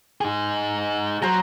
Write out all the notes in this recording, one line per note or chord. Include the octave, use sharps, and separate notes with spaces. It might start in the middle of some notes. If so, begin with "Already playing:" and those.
D#4 G#4
F#3 C5 A#5